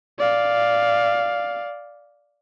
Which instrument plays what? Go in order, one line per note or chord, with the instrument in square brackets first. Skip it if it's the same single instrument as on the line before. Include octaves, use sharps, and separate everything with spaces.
[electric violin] D5 F5